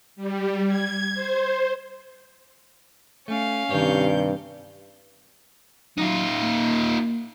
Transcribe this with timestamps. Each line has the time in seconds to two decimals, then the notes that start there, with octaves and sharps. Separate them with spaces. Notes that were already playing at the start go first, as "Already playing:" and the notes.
0.16 G3
0.68 G#6
1.15 C5
3.28 A3 C#4 F5
3.71 G2 C3 D#3 C#5 G6
5.98 F#3 D#4 F4
6.43 A#3